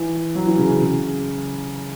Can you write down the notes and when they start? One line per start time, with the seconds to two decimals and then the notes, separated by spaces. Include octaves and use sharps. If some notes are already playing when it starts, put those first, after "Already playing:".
Already playing: E3
0.35 F#3
0.47 E3
0.58 C#3
0.81 C#3